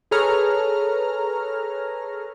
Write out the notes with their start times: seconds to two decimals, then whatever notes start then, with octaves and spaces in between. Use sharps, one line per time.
0.11 G#4 A4 B4 C#5 A#5 F6